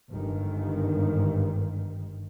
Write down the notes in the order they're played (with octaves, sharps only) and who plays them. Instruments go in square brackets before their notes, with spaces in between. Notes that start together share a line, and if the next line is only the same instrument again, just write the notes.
[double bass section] G1 G#2 D#3